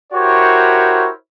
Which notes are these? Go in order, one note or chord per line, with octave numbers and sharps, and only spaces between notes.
E4 F#4 G4 A#4 C5 C#5